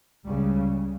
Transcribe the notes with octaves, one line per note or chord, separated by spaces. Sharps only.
C#2 C#3 G3